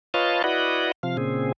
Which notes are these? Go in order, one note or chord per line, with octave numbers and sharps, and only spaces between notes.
F4 B4 C#5 D#5 F5 A5
E4 F#4 B4 D5 D#5 F#5
C3 F3 F5
A#2 C#3 C4 G#4